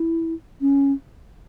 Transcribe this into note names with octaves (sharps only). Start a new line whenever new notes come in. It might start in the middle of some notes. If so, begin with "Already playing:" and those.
Already playing: E4
C#4